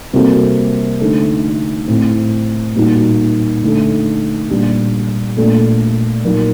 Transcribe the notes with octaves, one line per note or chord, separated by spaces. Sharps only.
C3 G3 A#3 F#4 A4
D3 A3 D#4 A4
A2 A3 C4
A#2 G3 A#3 D#4 F#4
D3 A3 D#4 A4
A#2 G3 D4
A#2 A3 D4 A4
A#2 F#3 A#3 D#4